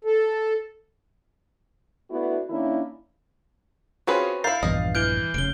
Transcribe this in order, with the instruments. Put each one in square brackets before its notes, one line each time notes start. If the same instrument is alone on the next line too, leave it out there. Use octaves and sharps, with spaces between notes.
[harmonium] A4
[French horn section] A3 B3 D4 E4 F#4
D#3 A#3 C#4 D4 E4
[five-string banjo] C4 C#4 B4 [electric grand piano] F4 F#4 G#4
[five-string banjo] E4 A#4 [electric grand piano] F5 G6 A6 [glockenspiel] C7
[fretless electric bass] A#1 E2 G2 [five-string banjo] D#5
[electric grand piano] E3 F6 [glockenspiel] G6 D7 G7
[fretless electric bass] F1 C#3 [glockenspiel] D7 G7